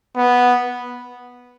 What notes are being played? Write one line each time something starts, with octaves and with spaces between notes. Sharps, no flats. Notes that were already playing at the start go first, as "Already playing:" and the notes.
B3